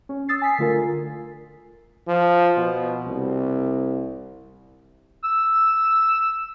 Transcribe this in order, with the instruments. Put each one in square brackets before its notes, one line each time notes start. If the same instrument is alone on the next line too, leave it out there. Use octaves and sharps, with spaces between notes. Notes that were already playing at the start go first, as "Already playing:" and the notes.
[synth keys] C#4
D#6 E6 A6 C7
G#5 B6 C7
D3 A3 F4 A#4 G#5
[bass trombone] F3
B2
C2
[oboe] E6